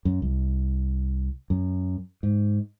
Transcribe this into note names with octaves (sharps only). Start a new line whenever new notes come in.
F#2
C2
F#2
G#2